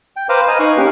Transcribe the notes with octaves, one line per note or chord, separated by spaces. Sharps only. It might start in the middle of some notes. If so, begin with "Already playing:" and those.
G5
B4 C5 F5 A#5 D6
B4 D#5 G#5 A#5
D#4 F5 A#5 C#6 F#6
A#3 C#4 G4 A#4